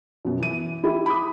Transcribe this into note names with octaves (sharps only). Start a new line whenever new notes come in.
F#2 B2
E3 D#7
E4 G4
B5 D6 D#6